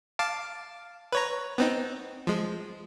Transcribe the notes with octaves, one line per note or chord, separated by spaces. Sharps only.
F5 A5 D6
B4 C#5 A#5
B3 C4 D#4
F3 G#3